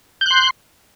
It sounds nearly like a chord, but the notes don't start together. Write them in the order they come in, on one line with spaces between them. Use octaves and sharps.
G6 F#6 C6